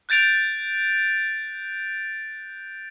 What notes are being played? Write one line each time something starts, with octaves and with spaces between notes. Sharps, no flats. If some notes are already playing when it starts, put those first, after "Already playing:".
F#6 G6 A6 D7 F7